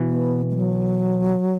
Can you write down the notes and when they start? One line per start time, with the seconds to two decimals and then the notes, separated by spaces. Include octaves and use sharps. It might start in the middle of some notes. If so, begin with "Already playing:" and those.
Already playing: B2 E3
0.08 B3
0.51 G#3
0.56 F#3